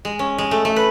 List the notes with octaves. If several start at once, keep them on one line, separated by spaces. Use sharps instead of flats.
G#3
C#4
G#3
A3
A3
B4